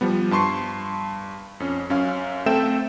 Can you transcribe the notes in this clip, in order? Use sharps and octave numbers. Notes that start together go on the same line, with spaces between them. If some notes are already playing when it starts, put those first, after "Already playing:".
F3 G3 B3
G2 A5 C6 C#6 C7
F2 C#4
F#2 C#4 F5
A3 C4 A4 E5 G5 E7